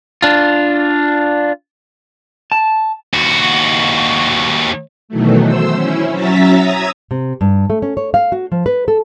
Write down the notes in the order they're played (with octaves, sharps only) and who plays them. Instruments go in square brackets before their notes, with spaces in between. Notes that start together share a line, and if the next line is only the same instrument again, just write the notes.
[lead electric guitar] D4 F4
[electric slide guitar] A5
[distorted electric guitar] D#2 F#4
[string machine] B2 D#3 E3 F#3 A3
C5 E6
C#4 E4
F#3 C#4 E5 A#5 A6 B6
A#5 D#6 E6 G#6
[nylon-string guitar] C3
G2
A3
C#4
C#5
F5
F#4
F3
B4
A4